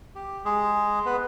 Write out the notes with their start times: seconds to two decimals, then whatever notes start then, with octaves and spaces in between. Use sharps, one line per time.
0.15 G4
0.45 G#3 G#4
1.05 B3 B4